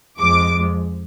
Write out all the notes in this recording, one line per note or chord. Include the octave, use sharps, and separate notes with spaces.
F2 F3 G#3 D6